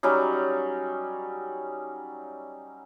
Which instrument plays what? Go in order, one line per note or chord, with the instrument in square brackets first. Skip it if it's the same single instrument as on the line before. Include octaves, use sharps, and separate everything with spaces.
[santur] F#3 G3 C#4 D#4